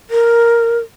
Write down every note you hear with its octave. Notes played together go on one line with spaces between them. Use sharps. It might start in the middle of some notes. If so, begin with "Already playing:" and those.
A#4